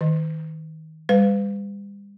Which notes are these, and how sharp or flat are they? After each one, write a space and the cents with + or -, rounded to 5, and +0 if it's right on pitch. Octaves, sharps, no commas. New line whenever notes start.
D#3 +25 D#5 +0
G3 +40 B4 +35